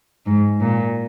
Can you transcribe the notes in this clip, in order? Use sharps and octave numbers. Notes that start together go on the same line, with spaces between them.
G#2
A#2